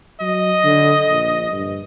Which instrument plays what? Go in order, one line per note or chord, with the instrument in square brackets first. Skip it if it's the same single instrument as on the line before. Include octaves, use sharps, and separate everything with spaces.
[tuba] F#3 [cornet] D#5
[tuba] D3
A#1
G2